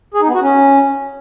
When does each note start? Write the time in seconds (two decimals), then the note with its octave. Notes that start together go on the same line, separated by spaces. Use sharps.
0.14 G#4
0.21 D#4
0.28 B3
0.35 F#4
0.41 C#4